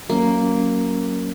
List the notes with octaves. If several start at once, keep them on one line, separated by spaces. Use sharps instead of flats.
F#3 A#3 C#4